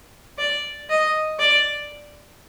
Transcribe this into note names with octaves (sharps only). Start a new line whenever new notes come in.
D5
D#5
D5